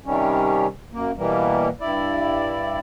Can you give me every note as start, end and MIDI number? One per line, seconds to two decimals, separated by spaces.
0.05 0.67 48
0.05 0.67 51
0.05 0.67 55
0.05 0.67 61
0.93 1.11 42
0.93 1.11 58
1.17 1.69 47
1.17 1.69 52
1.17 1.69 55
1.17 1.69 58
1.80 2.79 43
1.80 2.79 64
1.80 2.79 74